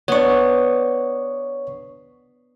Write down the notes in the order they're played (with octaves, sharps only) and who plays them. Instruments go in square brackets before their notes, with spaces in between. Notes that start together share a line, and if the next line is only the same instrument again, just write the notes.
[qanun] B3 D4 [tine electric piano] C#5 C#6